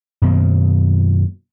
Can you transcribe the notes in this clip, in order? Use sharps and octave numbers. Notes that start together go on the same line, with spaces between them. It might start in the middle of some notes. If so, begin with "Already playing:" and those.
F#2 B2 D#3 A#3